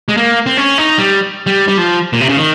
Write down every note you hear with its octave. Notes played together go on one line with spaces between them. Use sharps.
G#3
A#3
C4
C#4
D#4
G3
G3
G3
F3
A#2
C3
C#3
D#3